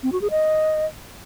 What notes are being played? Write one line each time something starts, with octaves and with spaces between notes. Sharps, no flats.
C4
F#4
G#4
D#5